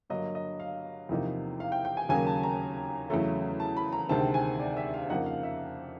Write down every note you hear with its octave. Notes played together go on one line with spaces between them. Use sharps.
G2 D3 F#3 A#3 D#5
D#5
F5
E2 C3 F3 A#3 D#4
F5
G5
G5
G#5
D#2 C#3 F#3 A#3 G#5
A5
A#5
E2 C#3 F#3 A3
A5
B5
A#5
D2 C3 D#3 G#3 C4 A5
G#5
D5
E5
F5
F2 C#3 F3 A#3 D#4 F#5
F5
E5